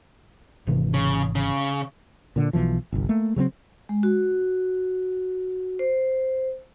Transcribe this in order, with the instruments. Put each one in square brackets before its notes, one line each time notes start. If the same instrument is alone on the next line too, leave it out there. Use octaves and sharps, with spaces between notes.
[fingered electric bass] G#1 C3 E3
[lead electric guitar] C#3
C#3
[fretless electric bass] A#2 D3
B1 B2 E3 F3
G1 C2
A3 A#3
C#3 F#3 G3 C4
[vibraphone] G#3
F#4
C5